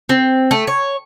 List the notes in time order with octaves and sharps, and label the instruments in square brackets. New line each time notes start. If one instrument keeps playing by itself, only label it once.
[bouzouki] C4
A3
C#5